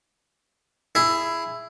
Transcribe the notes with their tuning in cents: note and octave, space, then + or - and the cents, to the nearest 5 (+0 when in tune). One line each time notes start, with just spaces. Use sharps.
E4 +10 G#4 +0